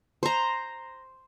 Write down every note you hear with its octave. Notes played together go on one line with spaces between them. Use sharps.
C5 A#5